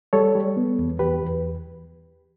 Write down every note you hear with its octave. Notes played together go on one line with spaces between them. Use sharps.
G3 A4 C#5
G3
B3
E2
E2 G4 B4
E2